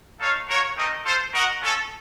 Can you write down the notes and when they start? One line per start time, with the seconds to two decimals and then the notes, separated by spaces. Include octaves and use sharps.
0.20 D#4 A4 C#5 F5
0.48 F#4 A#4 C#5 F5
0.76 A3 C4 D#4 A#4 D#5
1.05 F4 A4 C5
1.33 F#4 A#4 D#5 F#5
1.61 C#4 F4 A4